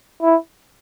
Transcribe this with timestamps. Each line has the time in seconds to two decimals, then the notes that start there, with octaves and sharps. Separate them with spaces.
0.22 E4